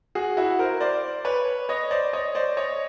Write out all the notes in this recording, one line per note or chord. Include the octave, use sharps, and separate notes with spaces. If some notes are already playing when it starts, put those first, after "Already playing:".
F#4 G#4
E4 F#4
A#4 C5
C5 D5
B4 C#5
C#5 D#5
C5 D5
C#5 D#5
C5 D5
C#5 D#5